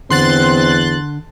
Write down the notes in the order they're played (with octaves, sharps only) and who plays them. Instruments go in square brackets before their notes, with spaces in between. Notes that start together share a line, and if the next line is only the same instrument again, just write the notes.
[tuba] E2 [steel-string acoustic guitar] D3 [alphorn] C4 [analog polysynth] C6 F#6 A6